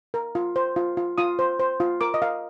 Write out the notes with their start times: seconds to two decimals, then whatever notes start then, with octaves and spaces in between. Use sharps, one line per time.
0.14 A#4
0.35 F4
0.56 C5
0.76 F4
0.97 F4
1.18 F4 D#6
1.39 C5
1.60 C5
1.80 F4
2.01 A#4 D6
2.14 D#5
2.22 A#4 F5